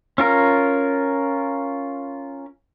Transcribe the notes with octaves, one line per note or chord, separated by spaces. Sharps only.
C#4 F4 A#4